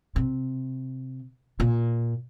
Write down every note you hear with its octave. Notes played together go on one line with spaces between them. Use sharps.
C3
A#2